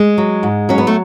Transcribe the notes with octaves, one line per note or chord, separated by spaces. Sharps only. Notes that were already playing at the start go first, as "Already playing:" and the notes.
Already playing: G#3
F#3
G#2
F#3 C#4
B3
A3